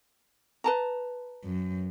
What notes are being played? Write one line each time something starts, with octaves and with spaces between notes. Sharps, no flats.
B4 A5 A#5
F#2